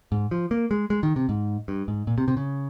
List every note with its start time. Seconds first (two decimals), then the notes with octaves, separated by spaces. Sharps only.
0.12 G#2
0.31 F3
0.51 A#3
0.71 G#3
0.90 G#3
1.03 D#3
1.16 C3
1.29 G#2
1.68 G2
1.88 G#2
2.07 A#2
2.18 C3
2.28 C3
2.37 C#3